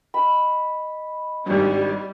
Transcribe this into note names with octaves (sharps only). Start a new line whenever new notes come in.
D#5 B5
G#1 G2 G3